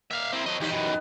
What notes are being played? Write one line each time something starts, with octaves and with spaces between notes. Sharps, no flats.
A#3 E5 F5
C4 E4
F#3 C4 D#5
D#2 E3 G3 D#4 G4
F#2 B2
B3